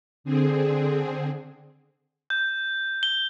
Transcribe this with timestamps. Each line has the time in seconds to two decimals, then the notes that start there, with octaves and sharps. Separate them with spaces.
0.24 D3 C4 G#4
2.30 G6
3.03 G7